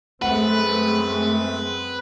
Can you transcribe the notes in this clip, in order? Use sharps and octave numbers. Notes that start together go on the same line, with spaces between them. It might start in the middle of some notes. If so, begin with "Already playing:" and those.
F#2 G#3 A3 C4 B4 F#5